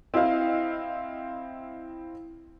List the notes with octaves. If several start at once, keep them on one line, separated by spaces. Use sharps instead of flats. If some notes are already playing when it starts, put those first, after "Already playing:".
C4 E4 D#5 F5